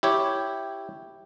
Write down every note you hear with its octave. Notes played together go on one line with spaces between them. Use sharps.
E4 G4 C#5